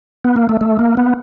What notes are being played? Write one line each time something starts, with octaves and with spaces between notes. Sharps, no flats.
B3
A#3
A3
A3
A#3
B3